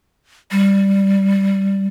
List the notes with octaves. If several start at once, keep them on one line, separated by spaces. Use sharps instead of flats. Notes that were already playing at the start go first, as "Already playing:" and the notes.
G3